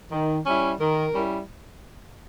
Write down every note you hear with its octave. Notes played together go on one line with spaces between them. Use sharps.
D#3
G3 C#4 E4
D#3 A#4
G3 C#4 E4